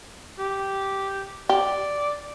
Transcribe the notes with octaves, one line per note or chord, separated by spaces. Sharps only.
G4
G4 D5